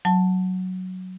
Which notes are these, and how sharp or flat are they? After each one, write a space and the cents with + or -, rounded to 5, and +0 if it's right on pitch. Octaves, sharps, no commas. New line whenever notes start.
F#3 +0 A5 +0